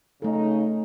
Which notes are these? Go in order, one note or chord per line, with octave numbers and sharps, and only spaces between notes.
C#3 A3 D#4 A4